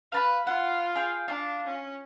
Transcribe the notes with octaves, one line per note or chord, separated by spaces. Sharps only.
B4 F5 A5 B5
F4 F#5
G#4 F5 G5
D4 F4
C#4